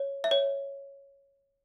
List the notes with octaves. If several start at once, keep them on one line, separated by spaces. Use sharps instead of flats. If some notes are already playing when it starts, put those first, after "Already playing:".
Already playing: C#5
E5
C#5